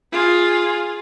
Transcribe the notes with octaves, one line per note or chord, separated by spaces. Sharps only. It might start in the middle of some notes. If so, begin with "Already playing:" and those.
F4 G#4